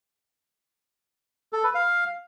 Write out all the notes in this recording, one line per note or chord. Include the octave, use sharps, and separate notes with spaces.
A4
B4
F5